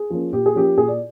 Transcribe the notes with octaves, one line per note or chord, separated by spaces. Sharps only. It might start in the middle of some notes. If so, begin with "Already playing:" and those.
Already playing: G#4
F3 A#3 C#4
A#2 G4
G#4
F3 A#3 C#4 G4
A#2 G#4
D5